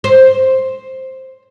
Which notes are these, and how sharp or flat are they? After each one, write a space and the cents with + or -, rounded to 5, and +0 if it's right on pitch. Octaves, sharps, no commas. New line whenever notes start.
C5 +5